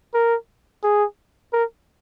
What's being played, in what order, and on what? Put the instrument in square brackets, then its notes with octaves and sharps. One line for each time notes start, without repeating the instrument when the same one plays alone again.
[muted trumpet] A#4
G#4
A#4